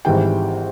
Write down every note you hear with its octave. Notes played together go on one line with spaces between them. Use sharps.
G#1 G#2 E3 G3 G5